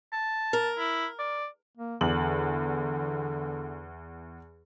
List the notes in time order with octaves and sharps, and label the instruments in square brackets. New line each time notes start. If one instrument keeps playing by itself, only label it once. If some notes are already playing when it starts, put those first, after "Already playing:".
[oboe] A5
[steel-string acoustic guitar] A#4
[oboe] E4
D5
[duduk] A#3
[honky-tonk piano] E2 F#7 [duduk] D3